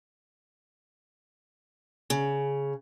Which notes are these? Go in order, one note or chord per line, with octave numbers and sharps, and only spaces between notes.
C#3